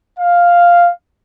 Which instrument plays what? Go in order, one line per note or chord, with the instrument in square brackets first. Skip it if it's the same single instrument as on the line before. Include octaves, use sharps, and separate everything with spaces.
[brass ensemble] F5